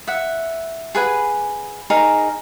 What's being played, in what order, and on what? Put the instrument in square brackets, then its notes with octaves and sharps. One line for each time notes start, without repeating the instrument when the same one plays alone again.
[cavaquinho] E5 F#5
G#4 B4 F#5 G#5
D#4 G#4 A#4 A#5